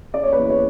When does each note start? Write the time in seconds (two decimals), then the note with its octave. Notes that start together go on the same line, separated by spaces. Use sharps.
0.14 C#4 D5
0.24 C#5
0.32 B4
0.38 E2
0.50 C#5